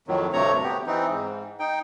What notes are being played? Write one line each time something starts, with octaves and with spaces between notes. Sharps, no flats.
F2 A2 D#3 F#3
D2 G2 C3 A3 C#5 A#5
B3 G4
E3 C4 D#4
G#2
D#4 G5